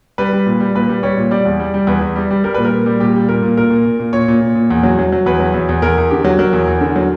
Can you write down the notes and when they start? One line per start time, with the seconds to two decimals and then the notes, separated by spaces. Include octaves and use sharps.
0.18 G3 B4
0.33 G3
0.46 A#2
0.60 G3
0.75 A#2 B4
0.89 G3
1.03 G3 C#5
1.17 A#2
1.31 G3 D5
1.45 E2
1.60 G3
1.74 G3
1.87 E2 B4
2.01 E2
2.16 G3
2.31 G3
2.44 G3 A#4
2.54 A#2 B4
2.65 A#4
2.72 A#2
2.86 G3
3.00 A#2 G4
3.15 G3
3.28 A#2 A#4
3.43 A#2
3.57 A#2 A#4
3.71 A#2
3.85 A#2
3.99 A#2
4.13 A#2 C#5
4.28 A#2
4.41 A#2
4.55 A#2
4.70 E2
4.83 F#3
4.99 F#3
5.12 F#3
5.26 E2 B4
5.40 F#3
5.54 E2
5.69 E2
5.82 E2 A#4
5.97 E2
6.10 D3 G4
6.24 F#3
6.39 F#3 A#4
6.53 E2
6.68 E2
6.81 D3
6.96 F#3